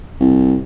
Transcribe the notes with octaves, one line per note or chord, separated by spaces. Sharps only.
C2